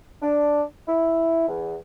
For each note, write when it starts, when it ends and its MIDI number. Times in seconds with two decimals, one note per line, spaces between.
0.22 0.63 62
0.88 1.46 64
1.48 1.76 40